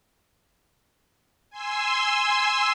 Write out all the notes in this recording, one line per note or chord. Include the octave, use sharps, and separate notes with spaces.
G#5 C6 E6